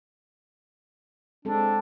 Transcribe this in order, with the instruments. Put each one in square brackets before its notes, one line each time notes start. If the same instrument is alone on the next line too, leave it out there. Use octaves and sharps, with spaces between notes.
[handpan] G#3 C4 A4 [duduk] D4